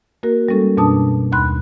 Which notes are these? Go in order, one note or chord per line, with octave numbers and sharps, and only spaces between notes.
A#3 F#4 A#4
G3 G#3 C#4 A4
F#2 B2 D4 A5 D#6
D#2 B5 C6 F#6